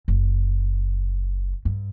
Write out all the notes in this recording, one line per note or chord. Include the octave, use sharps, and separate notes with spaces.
F#1
G2